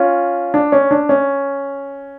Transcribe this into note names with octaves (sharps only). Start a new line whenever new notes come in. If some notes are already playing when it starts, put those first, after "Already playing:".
Already playing: C#4 F4
D4
C#4
D4
C#4